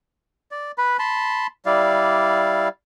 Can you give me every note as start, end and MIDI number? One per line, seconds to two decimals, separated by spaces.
0.51 0.72 74
0.78 0.97 71
0.78 0.97 83
0.99 1.47 81
0.99 1.47 83
0.99 1.47 84
1.66 2.68 55
1.66 2.68 64
1.66 2.68 74
1.66 2.68 77